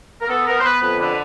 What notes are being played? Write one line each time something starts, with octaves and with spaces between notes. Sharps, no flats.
A#4
B3 A4
B3 A#4
C5
B3 B4
F2 B4
D3 B4